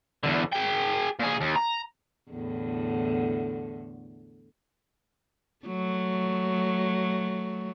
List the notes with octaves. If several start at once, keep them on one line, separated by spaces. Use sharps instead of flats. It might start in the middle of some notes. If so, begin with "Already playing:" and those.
E2 D3
G#4 G5
A#2 G#4
D#2
A#5
E2 A2 D3
F#3 A3